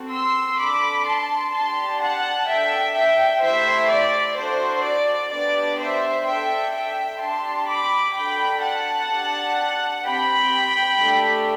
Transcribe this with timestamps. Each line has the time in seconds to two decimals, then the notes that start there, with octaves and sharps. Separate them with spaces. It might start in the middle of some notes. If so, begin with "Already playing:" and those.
Already playing: C4 F#4 A4
0.11 C6 E6
0.58 D4 A4 B5 D6
1.06 A5 C6
1.53 D4 G4 A5 C6
2.01 F#5 A5
2.48 A4 E5 G5
2.53 D4
2.95 E5 G5
3.42 A3 E4 G4 C5 E5
3.90 D5
4.37 D4 F#4 A4 C5
4.85 D5
5.32 B3 D4 G4 D5
5.79 C5 E5
6.26 D4 A4 E5 G5
6.74 E5 G5
7.21 D4 G4 A5 C6
7.68 B5 D6
8.16 D4 F#4 A4 G5 B5
8.63 F#5 A5
9.11 D4 G4
10.05 C4 G4 G5 B5
11.00 A3 D4 G4